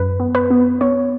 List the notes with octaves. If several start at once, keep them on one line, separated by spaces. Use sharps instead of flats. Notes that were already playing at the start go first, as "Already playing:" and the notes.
Already playing: F#2 B4
B3
B4
B3
B3 C#5